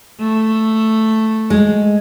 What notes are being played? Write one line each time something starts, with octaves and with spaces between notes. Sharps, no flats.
A3
G#3